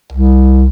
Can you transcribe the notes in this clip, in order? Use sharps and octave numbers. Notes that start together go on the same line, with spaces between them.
C2